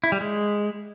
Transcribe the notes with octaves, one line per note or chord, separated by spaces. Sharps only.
E4
G3
G#3